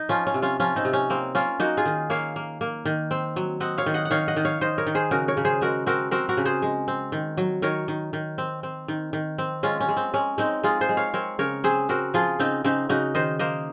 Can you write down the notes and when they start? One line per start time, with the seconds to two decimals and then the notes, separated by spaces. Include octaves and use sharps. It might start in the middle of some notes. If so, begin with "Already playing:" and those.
Already playing: D#4
0.09 F3 C#4 F4
0.27 C#4
0.34 C3
0.42 C#4 F4
0.60 F3 C#4 F4
0.76 C4 D#4
0.85 C3
0.93 C#4
1.10 A#3 C4
1.35 A#3 C#4 F4
1.60 A#3 D#4 F#4
1.77 F4 G#4
1.86 D#3
2.10 A#3 C#5 F5
2.36 A#3
2.61 A#3
2.85 D#3
3.11 C4
3.36 F#3
3.60 C4 D#5 F#5
3.78 C#5 F5
3.86 D#3
3.94 D#5 F#5
4.05 F#5
4.11 D#3 C#5 F5
4.28 D#5 F#5
4.37 D#3
4.45 C#5 F5
4.61 D#3 C5 D#5
4.78 A#4 C#5
4.87 D#3
4.95 G#4 C5
5.11 C#3 F#4 A#4
5.28 A#4 C#5
5.37 C#3
5.45 G#4 C5
5.61 G#3 F#4 A#4
5.86 C4 F#4 A#4
6.11 C4 F#4 A#4
6.29 F#4 A#4
6.37 C#3
6.45 G#4 C5
6.62 G#3
6.88 C4
7.12 D#3
7.37 F#3
7.62 D#3 A#4 C#5
7.88 D#3
8.13 D#3
8.38 C4
8.63 C4
8.88 D#3
9.13 D#3
9.38 C4
9.63 G#3 C#4 F4
9.80 C#4
9.89 G#3
9.97 C4
10.14 G#3 C#4
10.38 G#3 C4 D#4
10.64 G#3 F4 G#4
10.81 G#4 C5
10.89 G#3
10.97 C#5 F5
11.14 C4 A#4 C#5
11.39 C#3 A#4 C#5
11.64 C4 G#4 C5
11.89 C4 F#4 A#4
12.14 F3 F4 G#4
12.39 C#3 C4 D#4
12.64 C#3 C4 D#4
12.89 C#3 D#4 F#4
13.15 D#3 C5 D#5
13.39 A#3 C5 D#5